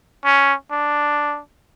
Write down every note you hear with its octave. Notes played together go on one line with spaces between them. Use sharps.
C#4
D4